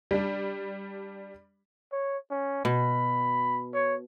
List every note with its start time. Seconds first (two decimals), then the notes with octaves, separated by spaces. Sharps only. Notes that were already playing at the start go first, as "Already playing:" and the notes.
0.11 G3 D4
1.92 C#5
2.31 C#4
2.65 B2 B5
3.73 C#5